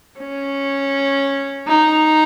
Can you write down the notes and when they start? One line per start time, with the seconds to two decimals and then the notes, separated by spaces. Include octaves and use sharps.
0.20 C#4
1.67 D#4